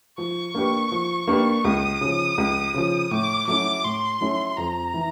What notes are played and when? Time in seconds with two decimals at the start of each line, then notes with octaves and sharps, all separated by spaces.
0.18 F3 C#6
0.55 A#3 D4 G4 B4
0.92 F3
1.28 A#3 D4 G4 B4
1.65 C#2 D#6
2.01 C#3 F3
2.38 C#2
2.74 C#3 F3
3.11 A2 D6
3.47 F#3 A3 C#4 E4 D6
3.84 A2 C6
4.21 F#3 A3 C#4 E4
4.57 F2 A#5
4.94 E3